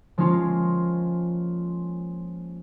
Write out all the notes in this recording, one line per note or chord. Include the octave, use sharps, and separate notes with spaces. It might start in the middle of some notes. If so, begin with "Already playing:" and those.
F3 G#3 A#3 C#4 F4